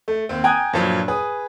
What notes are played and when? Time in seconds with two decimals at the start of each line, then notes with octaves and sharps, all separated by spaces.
0.08 A3
0.29 D#2 C4
0.44 G5 G#5 A#5 D#6 F#6 G#6
0.73 G2 A#2 F3 F#3
1.08 G#4 B4 D#6